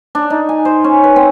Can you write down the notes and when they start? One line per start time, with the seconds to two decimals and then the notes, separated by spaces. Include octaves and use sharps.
0.15 D4
0.30 D#4
0.49 G#5
0.65 C5
0.84 C#4
1.04 B4
1.16 C4